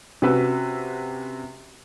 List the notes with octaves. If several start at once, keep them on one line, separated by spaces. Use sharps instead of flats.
C3 C#4 F#4 B4 E6